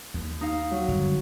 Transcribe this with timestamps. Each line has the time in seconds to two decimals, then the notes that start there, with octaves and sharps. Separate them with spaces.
0.14 D#2
0.41 D#4 F5
0.71 F#3
0.88 G1 F#2